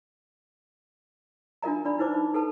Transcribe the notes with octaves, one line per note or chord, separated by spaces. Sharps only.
D4 F4 A#4 D#5 A#5
D4 D5 B5
D#4 E4 B4 C5 D6
D#4
D#4 A4 B4 A5